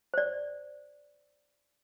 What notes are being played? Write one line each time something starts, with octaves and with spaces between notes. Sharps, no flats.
C5 D5